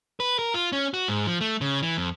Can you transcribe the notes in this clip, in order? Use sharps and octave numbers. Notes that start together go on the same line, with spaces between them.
B4
A#4
F4
C#4
F#4
G#2
F3
A3
C#3
E3
F2